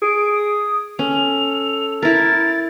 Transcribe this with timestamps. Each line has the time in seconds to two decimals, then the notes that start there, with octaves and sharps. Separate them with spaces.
0.02 G#4 D7
0.35 D#6
0.99 C#4 A4 F7
2.02 E4 A#4 A6